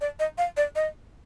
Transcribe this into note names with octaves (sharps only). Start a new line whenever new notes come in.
D5
D#5
F5
D5
D#5